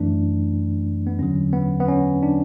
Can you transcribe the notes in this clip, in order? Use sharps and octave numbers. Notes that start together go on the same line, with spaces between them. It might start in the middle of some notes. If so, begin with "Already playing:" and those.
Already playing: F#2 E3 A3 D4
B3
E2 D3 F#3 C#4
B3
B3
C#4
D4